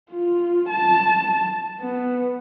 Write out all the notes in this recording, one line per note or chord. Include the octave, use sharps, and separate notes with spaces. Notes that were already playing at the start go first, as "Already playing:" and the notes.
F4
A5
B3